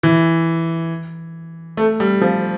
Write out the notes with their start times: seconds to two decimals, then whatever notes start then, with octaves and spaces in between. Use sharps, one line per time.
0.03 E3
1.77 A3
2.00 G3
2.21 F3